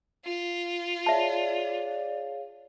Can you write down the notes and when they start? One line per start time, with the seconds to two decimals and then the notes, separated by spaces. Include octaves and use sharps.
0.25 F4
1.06 G#4 C#5 D5 E5 F5 A5